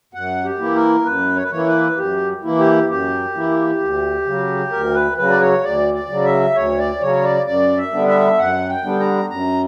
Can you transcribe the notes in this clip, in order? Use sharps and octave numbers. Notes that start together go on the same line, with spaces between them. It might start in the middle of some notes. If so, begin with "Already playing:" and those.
F#2 F#5
G4
E3 A#3 E4
A#4
F#2 B4
C#5
B4
E3 A#3 E4 C#5
B4
F#2 G4
E3 A#3 E4
G4
F#2 G4
E3 A#3 E4
D2
C#3 F#3
D2 A#4
B4
C#3 F#3 B4
D5
C#5
D2 D5
D5
C#3 F#3
E5
D2 C#5
D5
C#3 F#3 C#5
D5
F#2 D5
E5
D3 G3 B3 D4
E5
F#2 F#5
G5
D3 G3 B3 D4
A#5
F#2 A#5